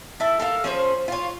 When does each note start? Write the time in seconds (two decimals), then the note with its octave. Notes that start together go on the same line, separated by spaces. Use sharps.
0.20 E4 A4
0.39 A4 A#4 F5
0.64 F3 C#4 G#4 C5
1.08 F4 C#5